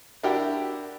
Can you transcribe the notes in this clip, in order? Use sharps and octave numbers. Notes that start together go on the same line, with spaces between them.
D4 E4 F#4 G4 A#4 G5